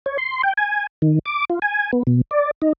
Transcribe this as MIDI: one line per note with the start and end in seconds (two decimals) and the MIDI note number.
0.06 0.17 73
0.18 0.42 84
0.43 0.53 79
0.57 0.87 80
1.02 1.19 51
1.26 1.45 86
1.50 1.59 65
1.62 1.91 80
1.93 2.03 59
2.07 2.21 47
2.31 2.51 74
2.62 2.73 63